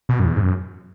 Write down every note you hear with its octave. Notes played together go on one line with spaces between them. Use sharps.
B2
F#2
E2
G#2
F#2